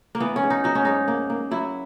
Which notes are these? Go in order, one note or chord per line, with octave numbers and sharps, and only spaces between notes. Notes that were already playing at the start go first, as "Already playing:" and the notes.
A#3
E3 B3
C#4
G#2
D#4
F#3 D#4
C#4
G#2 D#4
A#3
A#3
F#3 E4